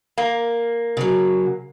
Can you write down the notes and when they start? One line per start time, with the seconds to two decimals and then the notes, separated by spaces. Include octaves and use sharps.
0.18 A#3
0.97 C#3 F#3